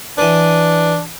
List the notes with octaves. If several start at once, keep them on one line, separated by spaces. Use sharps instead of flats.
E3 D4 B4